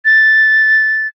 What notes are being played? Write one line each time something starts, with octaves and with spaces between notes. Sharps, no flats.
A6